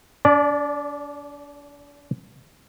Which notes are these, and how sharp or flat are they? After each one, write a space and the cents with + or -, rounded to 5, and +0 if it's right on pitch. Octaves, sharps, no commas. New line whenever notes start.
D4 -40 D5 +0